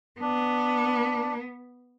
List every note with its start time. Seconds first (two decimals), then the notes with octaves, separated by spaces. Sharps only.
0.21 B3 D4